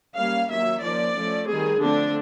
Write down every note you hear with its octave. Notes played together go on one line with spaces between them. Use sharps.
G3 A#3 C#4 F5
D#3 F#3 A#3 C#4 E5
F3 A#3 C#4 D5
F3 A3 C#4
D#3 G3 C4 G#4
D3 F3 A3 C4 D4